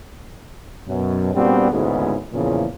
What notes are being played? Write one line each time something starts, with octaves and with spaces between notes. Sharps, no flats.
F#2 B2
A#2 G3 B3 C4 D4 F#4
G#1 D2 G#2 C#3 B3 E4
E2 A#2 C#3 F3 E4